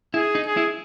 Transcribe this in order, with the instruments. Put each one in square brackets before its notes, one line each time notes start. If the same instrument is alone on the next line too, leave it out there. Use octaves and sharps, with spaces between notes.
[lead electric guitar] E4 [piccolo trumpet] G#4
[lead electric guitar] D#4
[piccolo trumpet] G#4
[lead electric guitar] E4